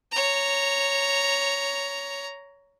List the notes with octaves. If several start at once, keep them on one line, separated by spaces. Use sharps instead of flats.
C#5 A#5